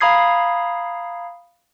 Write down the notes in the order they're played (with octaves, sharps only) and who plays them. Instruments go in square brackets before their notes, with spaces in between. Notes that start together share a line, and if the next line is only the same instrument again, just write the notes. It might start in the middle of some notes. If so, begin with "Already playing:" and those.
[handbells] F5 A#5 B5 D#6 G#6 C7